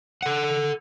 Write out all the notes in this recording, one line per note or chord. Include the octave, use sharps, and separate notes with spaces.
A4 F#5